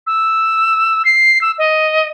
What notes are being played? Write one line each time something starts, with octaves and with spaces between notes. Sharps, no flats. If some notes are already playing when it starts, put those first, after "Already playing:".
E6
C7
E6
D#5